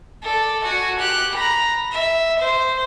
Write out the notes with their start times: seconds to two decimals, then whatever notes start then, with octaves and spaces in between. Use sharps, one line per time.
0.23 A4 D5
0.64 F#4 G#5
0.99 G4 F#6
1.34 A#5 B5
1.91 E5
2.39 C5